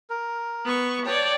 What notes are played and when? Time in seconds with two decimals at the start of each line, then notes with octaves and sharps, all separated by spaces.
0.10 A#4
0.65 B3 C#6
1.06 C#5 D5 G5 A5